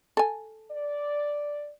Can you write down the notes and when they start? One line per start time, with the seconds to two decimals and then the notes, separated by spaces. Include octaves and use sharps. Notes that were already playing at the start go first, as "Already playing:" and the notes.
0.17 A4 G#5
0.71 D5